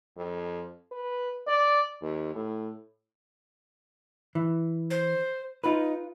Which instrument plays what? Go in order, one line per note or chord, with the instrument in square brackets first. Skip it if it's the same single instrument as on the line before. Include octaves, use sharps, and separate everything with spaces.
[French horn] F2
B4
D5
D#2
A2
[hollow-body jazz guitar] E3
[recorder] C5
[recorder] D#4 [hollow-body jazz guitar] F4 B4